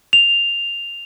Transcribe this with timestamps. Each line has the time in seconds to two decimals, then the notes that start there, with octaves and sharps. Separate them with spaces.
0.13 F7